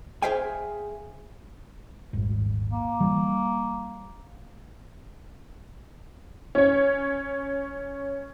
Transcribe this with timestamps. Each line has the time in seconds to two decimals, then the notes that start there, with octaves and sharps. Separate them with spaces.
0.22 G#4 C5 E5 F5 G5 G#5
2.13 D#1 G#1 G#2
2.71 A#3
3.00 E3 G3
6.55 C#4 C#5